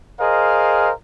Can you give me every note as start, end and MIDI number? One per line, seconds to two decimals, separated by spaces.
0.20 0.91 68
0.20 0.91 70
0.20 0.91 72
0.20 0.91 75
0.20 0.91 77